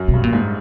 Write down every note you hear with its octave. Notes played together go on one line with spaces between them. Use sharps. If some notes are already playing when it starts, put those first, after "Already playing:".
Already playing: F#2
B2
G2
A#2
G#2